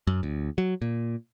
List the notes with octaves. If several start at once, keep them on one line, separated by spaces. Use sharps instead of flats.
F#2
D2
F#3
A#2